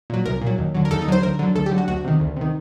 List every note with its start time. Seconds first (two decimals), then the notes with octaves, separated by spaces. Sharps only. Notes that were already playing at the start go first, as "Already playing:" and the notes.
0.10 A#2 F#3
0.26 C2 A#4
0.41 A#2
0.47 F#3
0.58 D#2
0.75 D3 F#3
0.85 A#4
0.91 D#2 A4
1.02 D#4
1.07 D3 F#3 C5
1.23 D2 A#4
1.39 D3 F#3
1.55 D2 A4
1.66 G4
1.71 D3 F#3
1.78 F#4
1.88 D2 F#4
2.05 C3 D#3
2.20 D2
2.36 C3 D#3